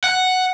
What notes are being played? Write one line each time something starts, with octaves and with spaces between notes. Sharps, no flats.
F#5